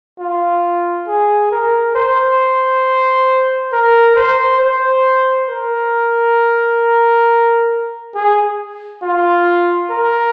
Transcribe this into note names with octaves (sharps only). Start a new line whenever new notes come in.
F4
G#4
A#4
C5
A#4
C5
C5
A#4
G#4
F4
A#4